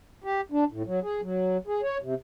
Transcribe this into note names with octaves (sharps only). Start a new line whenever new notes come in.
G4
D4
A2
F#3
G#4
F#3
G#4
C#5
C3